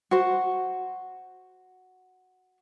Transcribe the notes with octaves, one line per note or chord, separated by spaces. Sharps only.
F#4 C5